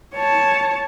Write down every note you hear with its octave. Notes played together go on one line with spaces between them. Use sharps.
C#5 A5